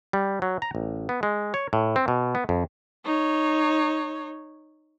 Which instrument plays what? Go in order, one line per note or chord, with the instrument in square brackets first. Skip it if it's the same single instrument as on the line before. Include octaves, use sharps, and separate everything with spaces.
[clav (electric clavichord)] G3
F#3
A#5
A1
B3
G#3
C#5
A2
C4
B2
B3
F2
[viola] D#4 C#5